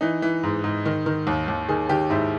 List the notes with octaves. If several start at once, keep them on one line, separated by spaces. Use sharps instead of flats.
E3 D#4
E3
G#2
G#2
D#3
D#3
D#2
D#2
D#3 G#4
D#3 G4
G#2 E4